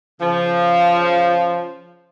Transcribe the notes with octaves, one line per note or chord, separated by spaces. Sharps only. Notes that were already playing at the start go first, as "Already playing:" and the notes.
C#3 F3